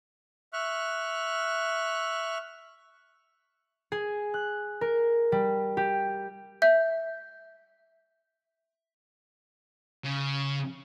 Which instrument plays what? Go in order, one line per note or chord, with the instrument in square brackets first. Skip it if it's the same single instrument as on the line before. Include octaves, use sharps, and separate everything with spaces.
[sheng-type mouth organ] E5 C#6 F6 F#6
[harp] G#4
F#6
A#4
G3
G4
[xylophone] E5 G6
[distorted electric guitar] C#3